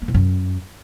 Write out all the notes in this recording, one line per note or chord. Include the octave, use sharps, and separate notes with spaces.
A#3
G#2
F#2